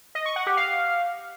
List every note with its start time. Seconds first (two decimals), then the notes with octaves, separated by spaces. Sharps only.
0.15 D#5
0.26 C#6
0.36 F#5
0.47 G4
0.57 F5